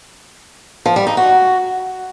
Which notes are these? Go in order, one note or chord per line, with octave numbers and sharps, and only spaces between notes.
F3
G3
D#4
F#4